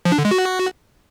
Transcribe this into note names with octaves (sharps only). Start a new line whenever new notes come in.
F3
D4
D3
G#3
F#4